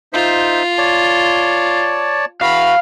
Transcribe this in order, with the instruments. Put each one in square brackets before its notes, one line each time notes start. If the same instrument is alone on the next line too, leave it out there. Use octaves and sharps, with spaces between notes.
[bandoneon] D#4 C5 E5 [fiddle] F4
[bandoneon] C#5 D5 A5
[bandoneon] E3 F#4 [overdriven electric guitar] F5 [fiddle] B5